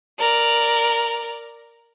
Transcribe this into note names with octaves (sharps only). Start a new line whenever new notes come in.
A#4 D5